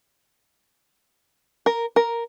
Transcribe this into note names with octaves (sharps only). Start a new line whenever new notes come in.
A#4
A#4